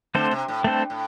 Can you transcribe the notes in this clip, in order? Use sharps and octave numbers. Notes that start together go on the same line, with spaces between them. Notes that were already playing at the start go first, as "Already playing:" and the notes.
D3 A3 C4 A4 C5
C3
A2
G2 A3 C4 A4 C5
A2